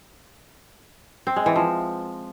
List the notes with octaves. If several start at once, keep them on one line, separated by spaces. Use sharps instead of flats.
C4
G#3
E3
F3